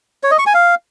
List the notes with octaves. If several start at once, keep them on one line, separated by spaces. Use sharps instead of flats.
C#5
D#5
C#6
G#5
F5